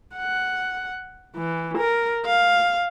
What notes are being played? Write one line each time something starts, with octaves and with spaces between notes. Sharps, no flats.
F#5
E3
A#4
F5